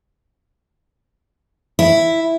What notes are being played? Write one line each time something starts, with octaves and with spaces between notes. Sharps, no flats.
E4